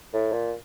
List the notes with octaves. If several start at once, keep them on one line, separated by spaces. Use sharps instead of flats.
A2
A#2